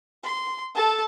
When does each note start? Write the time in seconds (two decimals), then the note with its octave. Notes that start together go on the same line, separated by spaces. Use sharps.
0.24 C6
0.75 A4 A5